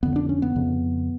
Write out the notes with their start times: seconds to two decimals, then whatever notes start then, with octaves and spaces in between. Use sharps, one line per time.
0.03 F2 D3 B3
0.16 D4
0.29 C#4
0.42 B3
0.56 F2 C#3